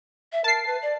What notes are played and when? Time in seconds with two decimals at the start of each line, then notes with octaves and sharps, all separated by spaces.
0.32 E5
0.44 A#4 A5 C7
0.66 B4
0.82 D5